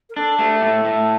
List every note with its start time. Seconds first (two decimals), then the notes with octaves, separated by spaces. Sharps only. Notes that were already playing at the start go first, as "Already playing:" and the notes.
0.09 A#4
0.16 D4 A4
0.38 A3 G4
0.55 A#4
0.61 A2 A4
0.85 A2